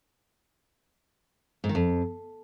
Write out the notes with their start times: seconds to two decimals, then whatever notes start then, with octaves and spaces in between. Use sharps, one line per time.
1.64 G#2
1.69 D#3
1.75 F2